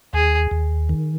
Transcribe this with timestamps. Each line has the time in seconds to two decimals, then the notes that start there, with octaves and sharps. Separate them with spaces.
0.13 D#2 G#4
0.51 D#2
0.89 D#3